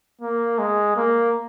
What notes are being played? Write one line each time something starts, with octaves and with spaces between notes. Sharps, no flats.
A#3
G#3
A#3